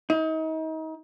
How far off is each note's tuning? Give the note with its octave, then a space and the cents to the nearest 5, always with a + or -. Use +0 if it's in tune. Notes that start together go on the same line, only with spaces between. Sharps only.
D#4 +35